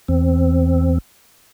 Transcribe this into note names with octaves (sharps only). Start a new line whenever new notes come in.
E2 C4